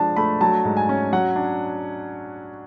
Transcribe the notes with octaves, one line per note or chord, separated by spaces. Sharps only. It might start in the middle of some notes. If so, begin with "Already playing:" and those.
Already playing: F3 G#3 D4 A5
A3 B5
F#3 A5
G#2
G#5
C#4
F#3 F#5
D4